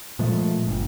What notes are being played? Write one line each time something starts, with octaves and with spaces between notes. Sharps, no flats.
A#2 F3 G#3 A3
G1